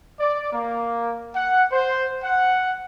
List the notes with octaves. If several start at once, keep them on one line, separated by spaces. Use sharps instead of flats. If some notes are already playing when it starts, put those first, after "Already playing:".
D5
A#3
F#5
C5
F#5